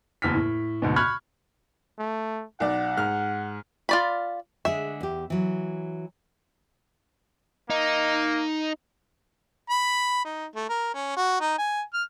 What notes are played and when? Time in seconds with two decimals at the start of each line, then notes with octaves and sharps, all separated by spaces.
0.22 F#1 E2 F6 B6
0.35 A2
0.82 D2 G#2 B2
0.96 B5 C#6 F6 F#6 G#6
1.99 A3
2.60 B1 D5 F#5
2.97 G#2 F6
3.89 F4 D5 B5
4.65 D3 G#3 G#4 E5
5.01 E2 G4
5.30 E3 F#3
7.70 A#3 D#4
9.70 B5
10.25 D#4
10.55 A3
10.69 A#4
10.94 C#4
11.17 F#4
11.41 D#4
11.58 G#5
11.93 F6